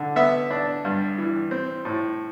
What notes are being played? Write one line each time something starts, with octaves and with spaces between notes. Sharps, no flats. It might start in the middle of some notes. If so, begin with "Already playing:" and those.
Already playing: D3
B3 E5
D4
G2
E3
C4
A2